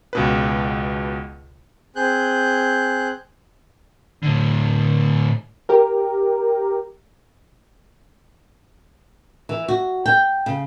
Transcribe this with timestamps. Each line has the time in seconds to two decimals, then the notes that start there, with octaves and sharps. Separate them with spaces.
0.13 C#2 B2 B4
1.96 C4 G#4 F#6 G6
4.23 A2 D3
5.69 G4 A#4
9.49 E3
9.68 F#4
10.06 G5
10.46 C#3